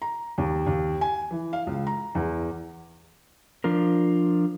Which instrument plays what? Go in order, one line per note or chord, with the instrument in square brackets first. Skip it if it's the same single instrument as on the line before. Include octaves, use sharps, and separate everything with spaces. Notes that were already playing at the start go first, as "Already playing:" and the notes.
[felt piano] A#5
D#2
D#2
G#5
E3
F5
C#2
A#5
E2
[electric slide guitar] F3 D4 F4 A#4